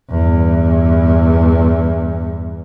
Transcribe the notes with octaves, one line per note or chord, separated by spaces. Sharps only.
E2 G2